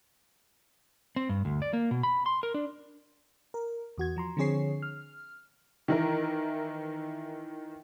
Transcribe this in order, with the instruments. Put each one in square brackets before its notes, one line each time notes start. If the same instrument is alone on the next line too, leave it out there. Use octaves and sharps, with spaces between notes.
[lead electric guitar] C4
G2
D2
D5
A#3
B2
B5
C6
A#4
D4
[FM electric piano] A#4
E2 F#4 G#6
F3 A#5 C6
D3 F3 C4 G#4 C#5 C7
F6
[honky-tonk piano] D#3 E3 A#4